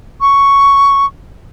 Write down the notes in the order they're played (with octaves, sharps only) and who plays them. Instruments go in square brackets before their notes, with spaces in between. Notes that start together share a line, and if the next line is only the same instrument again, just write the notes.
[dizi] C#6